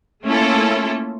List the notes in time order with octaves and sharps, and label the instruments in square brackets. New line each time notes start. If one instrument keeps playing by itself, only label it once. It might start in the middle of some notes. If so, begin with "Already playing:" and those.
[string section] A3 A#3 C#4 E4 F4 A4